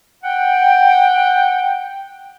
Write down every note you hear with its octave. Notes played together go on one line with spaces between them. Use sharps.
F#5 G5